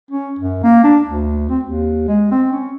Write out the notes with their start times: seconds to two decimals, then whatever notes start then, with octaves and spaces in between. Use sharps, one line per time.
0.11 C#4
0.39 F#2
0.64 A#3
0.84 D4
1.07 D2
1.49 C4
1.64 D#2
2.08 G#3
2.31 C4
2.53 C#4